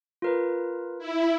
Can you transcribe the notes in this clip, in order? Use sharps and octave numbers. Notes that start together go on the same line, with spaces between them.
F4 A#4 B4
E4